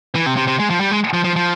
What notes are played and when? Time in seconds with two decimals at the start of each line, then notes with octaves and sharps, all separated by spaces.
0.15 E3
0.26 C3
0.37 C3
0.47 C3
0.59 G#3
0.70 F3
0.81 G3
0.91 G#3
1.14 F3
1.24 F3
1.36 F3